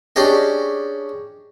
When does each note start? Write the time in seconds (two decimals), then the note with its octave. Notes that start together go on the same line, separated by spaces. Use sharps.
0.16 C#4 D4 G4 G#4 D#5